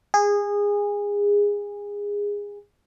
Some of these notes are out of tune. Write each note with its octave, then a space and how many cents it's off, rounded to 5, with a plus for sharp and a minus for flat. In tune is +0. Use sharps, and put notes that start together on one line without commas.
G#4 -20